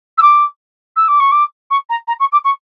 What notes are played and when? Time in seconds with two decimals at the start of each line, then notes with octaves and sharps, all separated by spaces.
0.18 E6
0.22 D6
0.96 E6
1.08 D6
1.20 C#6
1.32 D6
1.71 C#6
1.89 A#5
2.08 A#5
2.20 C#6
2.32 D6
2.45 C#6